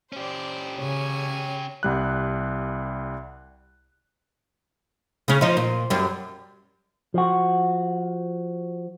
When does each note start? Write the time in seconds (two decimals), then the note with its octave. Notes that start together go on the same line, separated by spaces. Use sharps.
0.12 C#4 G4 C5 D5
0.78 C#3 C#5 G#5
1.83 C2 G3 F#6
5.28 C#3 C#4
5.41 F3 D#4
5.57 A#2
5.90 F#2 G3
7.14 F3 F#4